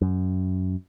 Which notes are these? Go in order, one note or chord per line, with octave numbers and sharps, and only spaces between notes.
F#2